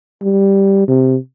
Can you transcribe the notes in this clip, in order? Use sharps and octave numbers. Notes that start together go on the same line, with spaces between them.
G3
C3